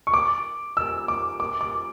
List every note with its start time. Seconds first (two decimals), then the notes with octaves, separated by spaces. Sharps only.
0.07 C#6
0.14 D6
0.77 E6
1.08 D6
1.40 D6
1.61 D6